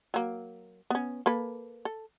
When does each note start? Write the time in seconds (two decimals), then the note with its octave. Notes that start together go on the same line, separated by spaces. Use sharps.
0.14 F#3 A#3
0.90 B3 C#4
1.26 A#3 A4 B4
1.85 A4